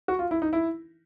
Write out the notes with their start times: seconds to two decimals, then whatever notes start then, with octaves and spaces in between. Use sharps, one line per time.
0.08 F#4
0.19 F4
0.31 E4
0.42 D#4
0.53 E4